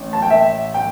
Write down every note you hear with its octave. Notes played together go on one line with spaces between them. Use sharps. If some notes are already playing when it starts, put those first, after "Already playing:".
Already playing: A1
A5
G5
E5
G5